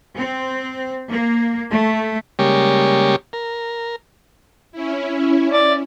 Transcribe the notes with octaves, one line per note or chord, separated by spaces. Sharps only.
C4
A#3
A3
C#3 G3 G#3 A#3 G4 C#5
A#4
C#4 E4
D5